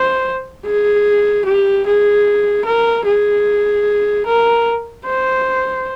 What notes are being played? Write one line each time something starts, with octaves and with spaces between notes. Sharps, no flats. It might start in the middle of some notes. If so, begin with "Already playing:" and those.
Already playing: C5
G#4
G4
G#4
A#4
G#4
A#4
C5